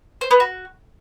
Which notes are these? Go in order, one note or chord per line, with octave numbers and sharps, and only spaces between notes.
C5
B3
F#4